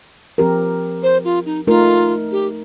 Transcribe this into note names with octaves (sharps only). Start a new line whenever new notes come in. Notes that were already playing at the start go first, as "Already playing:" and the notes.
F3 C4 G4 A#4
C5
F4
D#4
A3 D#4 F4 A#4
G4